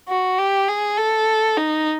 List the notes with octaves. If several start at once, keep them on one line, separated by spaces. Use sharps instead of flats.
F#4
G4
G#4
A4
D#4